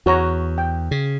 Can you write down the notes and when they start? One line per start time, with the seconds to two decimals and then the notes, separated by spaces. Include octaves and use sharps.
0.06 E2 F#4 C#5 A#5
0.58 G5
0.91 C#3